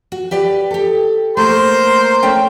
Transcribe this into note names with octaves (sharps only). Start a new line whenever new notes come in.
F#4
G4 B4 D5
G4 A4
A3 A#3 A#4 C5 C6
A3 C#4 G5